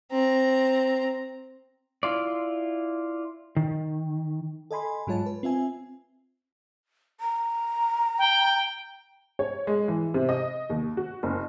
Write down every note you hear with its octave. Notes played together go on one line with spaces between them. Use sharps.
C4 A#5
E4 F4 D5
D#3
A4 D#5 G#5 B5 C6
G#2 F#3 G#3 F4 C#5 A5
B4
C4 F4 E5 G#5
A#5
G5
C#5
G#3
E3
C3
D#5
D#2
F#4
F#1